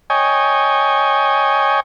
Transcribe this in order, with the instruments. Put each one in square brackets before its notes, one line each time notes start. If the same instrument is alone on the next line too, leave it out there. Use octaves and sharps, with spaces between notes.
[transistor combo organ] C#5 D#5 G5 G#5